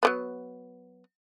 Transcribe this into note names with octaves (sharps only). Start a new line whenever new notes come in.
F#3 A#3 B3